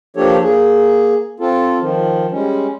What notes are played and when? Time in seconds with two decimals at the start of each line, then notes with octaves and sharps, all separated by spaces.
0.17 F3 A#3 D4 G4 A4 C#5
0.43 A#3 G#4
1.40 C4 F4 A4
1.79 D#3 F3
2.32 G3 G#3 C#4